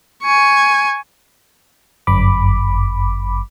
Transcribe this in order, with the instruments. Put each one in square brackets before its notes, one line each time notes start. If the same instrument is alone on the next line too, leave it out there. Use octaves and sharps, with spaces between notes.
[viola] G#5 C#6
[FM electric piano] G1 F#2 B5 D6